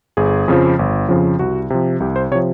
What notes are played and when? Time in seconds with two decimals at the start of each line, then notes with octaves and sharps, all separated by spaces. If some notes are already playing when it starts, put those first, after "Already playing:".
0.17 G1 G#4
0.48 F2 C#3 F3
0.79 G1
1.09 F2 C#3 F3
1.39 C2 F#4
1.70 C3 F3
2.00 C2 G4
2.16 C5
2.31 C3 C#5
2.35 F3